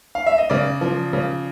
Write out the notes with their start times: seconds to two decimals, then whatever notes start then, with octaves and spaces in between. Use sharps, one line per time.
0.15 F5
0.27 E5
0.38 D#5
0.50 C#3 D5
0.81 F3
1.13 C#3